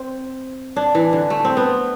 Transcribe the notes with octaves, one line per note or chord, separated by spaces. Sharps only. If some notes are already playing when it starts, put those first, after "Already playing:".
Already playing: C4
D4
E3
D3
A3
C4
B3